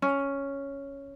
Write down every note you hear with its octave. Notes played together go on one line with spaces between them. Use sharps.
C#4